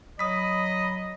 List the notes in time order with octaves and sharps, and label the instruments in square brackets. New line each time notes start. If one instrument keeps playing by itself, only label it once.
[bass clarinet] F#3 [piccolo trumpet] D#5 [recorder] B5 [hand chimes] D#6 B6